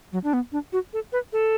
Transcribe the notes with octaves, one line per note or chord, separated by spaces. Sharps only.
F#3
D4
B3
D4
F#4
A4
B4
A4